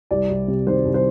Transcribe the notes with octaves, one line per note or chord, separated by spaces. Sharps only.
C2 D5
C2
C3
D#3 C5
C2
C5